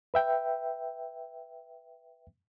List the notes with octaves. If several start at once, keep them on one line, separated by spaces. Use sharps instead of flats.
B4 E5 G5